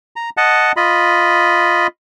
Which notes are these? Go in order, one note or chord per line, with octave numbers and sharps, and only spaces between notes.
A#5
D#5 F#5 A5
F4 D#5 B5